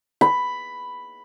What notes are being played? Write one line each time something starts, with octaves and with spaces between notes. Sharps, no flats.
B5